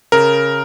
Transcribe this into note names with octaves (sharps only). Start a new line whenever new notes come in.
C#3 A#4